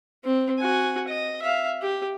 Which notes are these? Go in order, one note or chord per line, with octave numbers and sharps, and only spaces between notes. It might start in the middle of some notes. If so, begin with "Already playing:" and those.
C4
F#4 G#5
D#5
E5 F5
G4